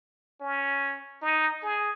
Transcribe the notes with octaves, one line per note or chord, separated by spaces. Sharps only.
C#4
D#4
G#4